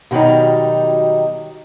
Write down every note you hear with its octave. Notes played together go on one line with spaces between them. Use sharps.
B2 D#3 F#3 G3 D#4